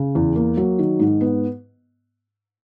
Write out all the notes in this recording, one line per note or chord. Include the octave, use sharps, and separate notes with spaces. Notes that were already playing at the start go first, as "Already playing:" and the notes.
Already playing: C#3
E2
A#3
F#3
D#3
G#2
B3